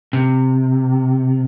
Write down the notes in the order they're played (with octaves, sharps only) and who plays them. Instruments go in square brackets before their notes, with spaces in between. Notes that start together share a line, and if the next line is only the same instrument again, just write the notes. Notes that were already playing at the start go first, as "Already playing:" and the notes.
[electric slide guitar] C3